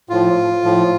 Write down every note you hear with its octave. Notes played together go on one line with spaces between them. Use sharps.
A2 F3 F4
A2 F3